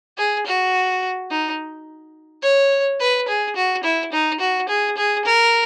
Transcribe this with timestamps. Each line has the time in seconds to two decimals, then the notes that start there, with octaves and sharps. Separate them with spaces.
0.18 G#4
0.46 F#4
1.31 D#4
2.43 C#5
3.00 B4
3.28 G#4
3.56 F#4
3.83 E4
4.12 D#4
4.40 F#4
4.69 G#4
4.97 G#4
5.25 A#4